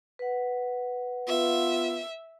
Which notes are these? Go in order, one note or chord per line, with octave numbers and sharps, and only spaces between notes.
B4 F#5
B3 F4 E5